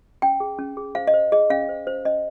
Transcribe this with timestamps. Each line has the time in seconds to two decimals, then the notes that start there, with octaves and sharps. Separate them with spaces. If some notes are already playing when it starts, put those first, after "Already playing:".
0.22 C#4 G5
0.40 G#4
0.59 C#4
0.77 G#4
0.95 C5 F5
1.07 D#5
1.14 C5
1.32 G#4 D#5
1.50 C#4 F5
1.69 C5
1.87 C5
2.05 C#4 D#5